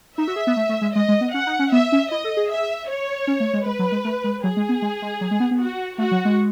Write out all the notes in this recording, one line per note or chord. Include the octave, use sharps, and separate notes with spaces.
D#4 E5
F#4
G#4
B3
A3
A3
G#3
G#3 D#5
G#3
B3
C#4 F#5
D#4
C#4
B3 E5
C#4
E4 D#5
A4
G#4
E5
C#5
C#4
A3
G#3
G#3 B4
F#3
G#3
A3
G#3
F#3 G#4
G#3
B3
G#3
G#3
F#3
G#3
B3
B3
F#4
A3 F#4
F#3
G#3